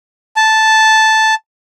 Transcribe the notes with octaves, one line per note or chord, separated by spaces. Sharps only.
A5